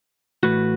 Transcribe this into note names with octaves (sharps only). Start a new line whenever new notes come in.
A2 E3 A3 F#4 B4